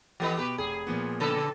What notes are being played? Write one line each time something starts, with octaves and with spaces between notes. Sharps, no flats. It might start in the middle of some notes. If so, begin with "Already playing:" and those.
E3 B3 G4 A4 B4 D#5
B2 G4 B4
F1 G#4
A#2 F3 B3
C#3 A4 B4